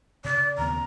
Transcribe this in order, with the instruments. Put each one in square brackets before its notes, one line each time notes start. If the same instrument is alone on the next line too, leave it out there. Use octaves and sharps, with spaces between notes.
[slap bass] C#3 [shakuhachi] D5
[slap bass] D#2 C#3 B3 [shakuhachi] A#5